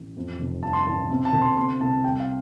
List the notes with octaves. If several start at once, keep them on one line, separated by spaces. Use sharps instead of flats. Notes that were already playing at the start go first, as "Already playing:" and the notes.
Already playing: A1
F2
F1
G2 A5
C6
A5
A1
C3
A5
D2
C6
C3 C6
C2 A5
G3 G5
F5